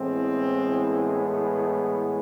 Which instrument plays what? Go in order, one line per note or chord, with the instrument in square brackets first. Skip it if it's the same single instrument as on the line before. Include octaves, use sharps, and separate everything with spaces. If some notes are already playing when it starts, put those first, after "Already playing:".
Already playing: [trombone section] A2 E3 G#3 B3 C4